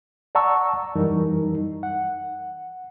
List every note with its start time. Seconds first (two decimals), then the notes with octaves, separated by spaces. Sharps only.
0.35 D5 F#5 A5 A#5 C#6 E6
0.95 F#2 E3 G3 D#4 A#4
1.83 F#5